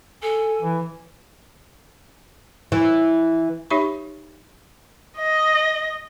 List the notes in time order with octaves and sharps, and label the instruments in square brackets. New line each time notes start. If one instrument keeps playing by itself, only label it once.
[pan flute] A4 [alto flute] G#5
[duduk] E3
[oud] E3
[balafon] D#4 G4 C#5 E5 B5 C#6
[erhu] D#5